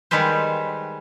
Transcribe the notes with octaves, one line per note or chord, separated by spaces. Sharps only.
D#3 G3 G#3 B4 C5